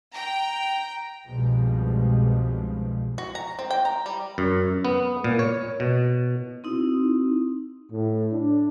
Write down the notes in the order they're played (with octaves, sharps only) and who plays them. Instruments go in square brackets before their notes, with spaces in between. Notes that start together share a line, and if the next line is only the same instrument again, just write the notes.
[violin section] G5 A#5
[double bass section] C2 G2 B2 F3 G3 G#3
[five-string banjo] F#4
A#5
C4
G5
A#5
G3
[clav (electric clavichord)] F#2
B3
A#2
C#5
B2
[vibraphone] C4 D#4 E4 F#4
[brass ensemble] A2
D4